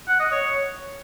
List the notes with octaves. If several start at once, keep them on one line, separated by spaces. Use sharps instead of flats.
F#5
D#5
C#5